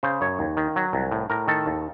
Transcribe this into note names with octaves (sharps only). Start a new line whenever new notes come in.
C#3 C5
F#2 C#5
D#2
D#3
F#3
C2
A2
A2 A#4
D#3 A4
D#2